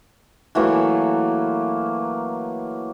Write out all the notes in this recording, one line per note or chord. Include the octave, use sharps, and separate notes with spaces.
E3 F#3 A3 A#3